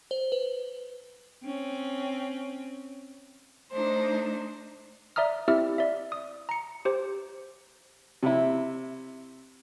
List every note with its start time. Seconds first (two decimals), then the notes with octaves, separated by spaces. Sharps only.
0.11 C5
0.32 B4
1.45 C4 C#4
3.72 A3 D4 D#4 C5
5.16 D5 E5 A#5 D#6 F6
5.48 C4 E4 G4 E5 E6 F6
5.78 D5 E5
6.12 D#6
6.49 A#5 C#7
6.85 G4 C5
8.23 C3 E4